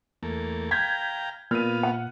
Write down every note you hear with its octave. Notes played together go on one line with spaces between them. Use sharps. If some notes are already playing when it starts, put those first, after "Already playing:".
E2 A3 A#3
F5 G5 A#5 G6 G#6 B6
A#2 B3 F5 F6 D#7
F#5